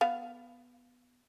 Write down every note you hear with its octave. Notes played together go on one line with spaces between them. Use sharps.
B3 F5